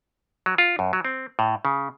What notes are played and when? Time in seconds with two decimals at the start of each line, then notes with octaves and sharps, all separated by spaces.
0.46 F#3
0.58 F4
0.79 F#2
0.93 F#3
1.05 C4
1.39 A2
1.65 C#3